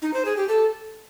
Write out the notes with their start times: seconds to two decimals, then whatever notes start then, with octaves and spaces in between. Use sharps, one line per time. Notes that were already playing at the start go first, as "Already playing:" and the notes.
0.02 D#4
0.14 C5
0.25 G#4
0.37 G4
0.48 A4